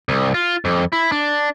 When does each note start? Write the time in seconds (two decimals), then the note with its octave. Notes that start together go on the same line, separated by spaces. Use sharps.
0.09 C2
0.34 F4
0.65 F2
0.92 E4
1.12 D4